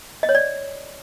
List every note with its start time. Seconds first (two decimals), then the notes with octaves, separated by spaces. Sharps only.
0.23 D#5
0.29 C#5
0.35 D5